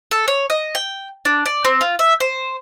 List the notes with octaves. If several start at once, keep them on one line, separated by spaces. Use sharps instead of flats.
A4
C#5
D#5
G5
D4
D5
C4
F4
E5
C5